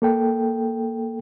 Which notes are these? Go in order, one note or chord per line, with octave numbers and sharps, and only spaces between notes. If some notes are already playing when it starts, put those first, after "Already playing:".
A#3 A4 G5